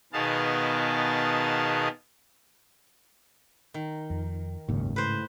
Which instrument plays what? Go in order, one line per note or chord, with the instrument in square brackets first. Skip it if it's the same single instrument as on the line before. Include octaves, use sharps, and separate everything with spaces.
[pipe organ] B2 D#3 B3 G#4 F5 A5
[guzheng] D#3
[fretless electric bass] F2
[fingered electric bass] F#1 D#2 [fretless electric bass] G#2 C#3
[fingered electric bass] A2 [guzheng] B4 C5